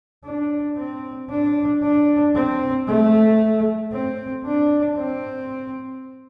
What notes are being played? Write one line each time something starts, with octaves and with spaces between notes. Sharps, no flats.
D4
C4
D4
D4
C4
A3
C4
D4
C4